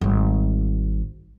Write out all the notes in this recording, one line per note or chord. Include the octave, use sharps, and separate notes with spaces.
G#1 G3